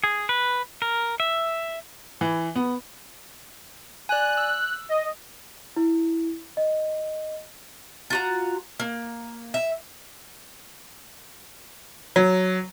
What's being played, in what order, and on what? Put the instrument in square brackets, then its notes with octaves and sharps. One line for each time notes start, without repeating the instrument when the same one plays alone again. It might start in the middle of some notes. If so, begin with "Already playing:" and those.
[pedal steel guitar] G#4
B4
A#4
E5
[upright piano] E3
B3
[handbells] D5 G#5 [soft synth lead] F#6
[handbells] E6
[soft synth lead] D#5
[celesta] E4
D#5
[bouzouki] F4 F#4 A#5
A#3
E5
[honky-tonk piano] F#3